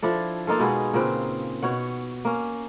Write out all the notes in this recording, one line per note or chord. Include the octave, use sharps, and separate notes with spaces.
F3 D4 E4 A4
A#3 D#4 F4 A4
B2 G#3 B3 G#4
A#2 C#3 C4 B4
B2 C#5 F#5
A#3 C#4